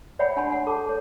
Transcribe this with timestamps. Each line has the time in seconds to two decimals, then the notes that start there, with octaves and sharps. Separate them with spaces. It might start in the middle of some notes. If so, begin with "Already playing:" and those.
0.19 C#5 D5 E5 F#5 G5 B5
0.37 D4 F#5 G#5 B5 C6
0.51 C#5 F#5 G#5
0.67 A4 A5 D6
0.86 A4 C#5